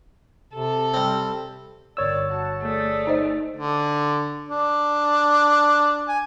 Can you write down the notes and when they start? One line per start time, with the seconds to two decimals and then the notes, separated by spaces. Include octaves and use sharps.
0.53 C3 A4
0.94 G3 C4
1.97 G1 D#2 C#5 D5 E6
2.30 F#4 A5
2.62 A3 G#4 D5
3.07 D#4 C5 D#5
3.57 D3
4.49 D4
6.08 G#5